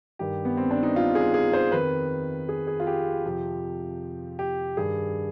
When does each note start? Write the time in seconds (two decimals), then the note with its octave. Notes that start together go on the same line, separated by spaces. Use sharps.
0.19 G2 D#3 G4
0.45 B3
0.57 C4
0.71 D4
0.83 D#4
0.96 F4
1.15 G#4
1.34 G#4
1.53 C5
1.72 F2 D#3 B4
2.49 G#4
2.67 G#4
2.80 F4
2.87 G4
3.25 F2 C3 F3
4.39 G4
4.77 G2 D#3 G#4